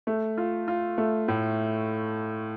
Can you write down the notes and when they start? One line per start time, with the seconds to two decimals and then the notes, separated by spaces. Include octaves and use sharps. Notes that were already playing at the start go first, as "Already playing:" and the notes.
0.07 A3
0.38 F4
0.68 F4
0.98 A3
1.28 A2